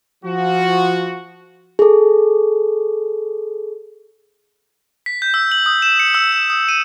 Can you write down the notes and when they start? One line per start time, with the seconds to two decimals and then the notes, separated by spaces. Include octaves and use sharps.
0.24 F3 F#4
1.79 G#4 A4
5.06 B6
5.22 G6
5.34 E6
5.51 F#7
5.66 D#6
5.82 E7
6.00 C#7
6.14 E6
6.32 E7
6.50 D#6
6.69 D#7